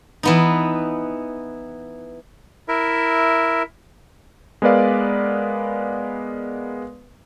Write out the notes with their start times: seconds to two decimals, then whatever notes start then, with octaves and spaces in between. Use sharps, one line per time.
0.23 E3 B3 D#4
2.68 E4 A#4 E5
4.62 G#3 B3 A#4 B4 D5 F5